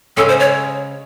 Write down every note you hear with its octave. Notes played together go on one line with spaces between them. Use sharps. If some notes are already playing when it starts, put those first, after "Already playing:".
C#3 G#3 C#4 A4
C5
C#5